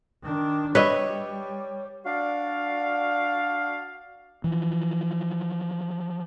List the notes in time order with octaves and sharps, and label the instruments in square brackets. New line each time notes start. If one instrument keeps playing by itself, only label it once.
[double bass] D#3 D4
[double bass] G3 [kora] B4 D#5 E5 [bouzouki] C#5
[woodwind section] D4 F#4 D5 F5
[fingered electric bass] E3 F3